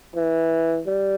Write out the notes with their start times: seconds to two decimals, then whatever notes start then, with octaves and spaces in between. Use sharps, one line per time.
0.16 E3
0.86 G3